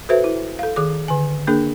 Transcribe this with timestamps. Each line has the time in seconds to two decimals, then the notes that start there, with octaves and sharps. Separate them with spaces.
0.09 F#4 A4 B4 C5 E5
0.24 E4
0.59 A4 F5
0.76 D#3 G#4 D6
1.08 D3 G#5
1.47 A#3 D4 G#4 A#4